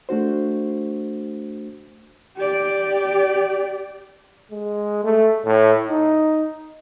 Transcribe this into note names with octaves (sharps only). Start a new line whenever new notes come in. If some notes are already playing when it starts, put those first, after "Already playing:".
A3 D4 F#4 C5
G4 D5
G#3
A3
A2
D#4